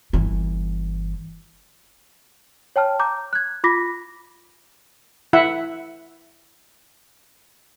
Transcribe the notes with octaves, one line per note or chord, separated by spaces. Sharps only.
G1 E3
C#5 G5 A5 F6
A#5 D6 G6
F#6 G#6
F4 B5 D6 A#6 B6
E4 E5 F#5